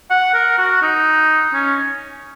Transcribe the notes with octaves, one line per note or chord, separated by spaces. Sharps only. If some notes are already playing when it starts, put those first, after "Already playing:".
F#5
A#4
F#4
D#4
C#4